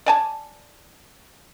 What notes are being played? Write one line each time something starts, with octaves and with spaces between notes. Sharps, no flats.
D5 G#5 A5